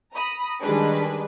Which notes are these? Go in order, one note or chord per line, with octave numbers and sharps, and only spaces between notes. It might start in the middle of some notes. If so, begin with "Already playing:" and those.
A#5 B5 D#6
D#3 G3 G#3 D4 B4